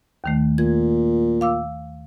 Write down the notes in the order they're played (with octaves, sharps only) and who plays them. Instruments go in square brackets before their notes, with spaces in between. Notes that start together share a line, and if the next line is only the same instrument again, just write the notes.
[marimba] D#2 D#3 A3
[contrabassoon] A#2 [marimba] G#6
[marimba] F5 D6 E6